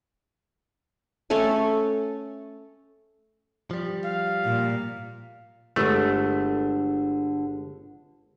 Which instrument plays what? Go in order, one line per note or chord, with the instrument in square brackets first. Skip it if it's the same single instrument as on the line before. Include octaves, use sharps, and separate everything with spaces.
[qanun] A3 C#4 A4 G#5
[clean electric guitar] F3 G3
[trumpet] F5
[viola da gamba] A#2
[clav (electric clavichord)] G1 A3 [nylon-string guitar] D3 G#3